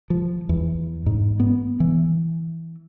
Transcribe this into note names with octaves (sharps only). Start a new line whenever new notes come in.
F3
E2
G#2
B3
E3